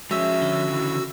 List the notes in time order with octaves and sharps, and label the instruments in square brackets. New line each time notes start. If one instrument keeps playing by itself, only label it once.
[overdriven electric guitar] F3 C#4 [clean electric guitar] G#3 [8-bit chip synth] F#4 E6 [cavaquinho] E5
[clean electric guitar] D3
[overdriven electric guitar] C#3 E3